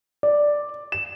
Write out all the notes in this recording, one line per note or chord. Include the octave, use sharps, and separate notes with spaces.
D5
E7